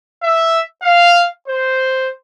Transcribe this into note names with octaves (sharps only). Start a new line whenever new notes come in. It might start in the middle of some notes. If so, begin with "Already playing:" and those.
E5
F5
C5